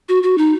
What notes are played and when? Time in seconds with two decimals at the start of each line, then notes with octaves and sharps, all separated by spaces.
0.09 F#4
0.23 F#4
0.38 D#4